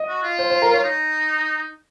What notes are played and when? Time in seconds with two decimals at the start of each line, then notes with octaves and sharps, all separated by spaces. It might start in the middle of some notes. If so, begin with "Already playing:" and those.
Already playing: D#5
0.08 F#4
0.23 F4
0.39 C5
0.50 C5
0.62 A#4
0.73 C#5
0.84 D#4